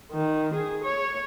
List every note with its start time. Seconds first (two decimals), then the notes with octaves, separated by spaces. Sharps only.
0.11 D#3
0.54 G#4
0.84 C#5